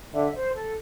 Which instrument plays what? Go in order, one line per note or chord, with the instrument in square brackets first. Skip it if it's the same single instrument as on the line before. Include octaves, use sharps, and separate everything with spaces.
[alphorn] D3 [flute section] E5
[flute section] C5
A4